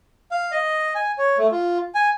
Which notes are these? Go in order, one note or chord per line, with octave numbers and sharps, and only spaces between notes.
F5
D#5
G#5
C#5
A3
F4
G#5